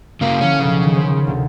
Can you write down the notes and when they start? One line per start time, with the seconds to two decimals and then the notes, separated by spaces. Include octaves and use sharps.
0.21 C#3 A#3 F5 A#5
0.41 D3 F3 C#4 E4
0.60 E1 B1 C#3 B4
0.83 D#3
0.96 C5 C#5 C6
1.27 D2 C3